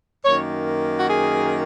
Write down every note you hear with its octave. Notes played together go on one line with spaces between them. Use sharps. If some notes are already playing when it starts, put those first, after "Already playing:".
F#2 D#3 A#3 C#5
F#4
G#4